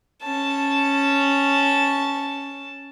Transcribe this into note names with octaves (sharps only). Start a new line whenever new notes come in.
C#4 A5